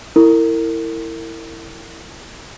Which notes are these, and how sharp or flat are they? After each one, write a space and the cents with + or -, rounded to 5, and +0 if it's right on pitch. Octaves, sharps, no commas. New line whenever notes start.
E4 +0 A#4 -35